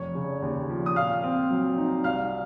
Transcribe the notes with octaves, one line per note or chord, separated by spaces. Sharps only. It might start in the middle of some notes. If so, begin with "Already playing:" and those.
Already playing: F1 C#5 C#6
C#3
D#2
F3
D#6
A#2 F5 F6
C4
F#3
D#4
C2 F5 F6